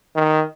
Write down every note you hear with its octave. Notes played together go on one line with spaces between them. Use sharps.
D#3